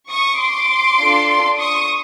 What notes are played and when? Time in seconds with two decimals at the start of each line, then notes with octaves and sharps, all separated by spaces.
0.10 C#6 D#6
0.40 C6 D6
0.99 D4 F4 A4
1.59 C#6 D#6